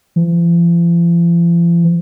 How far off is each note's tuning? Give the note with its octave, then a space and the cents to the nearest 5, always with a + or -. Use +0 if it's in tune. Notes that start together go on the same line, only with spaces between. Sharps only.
F3 -45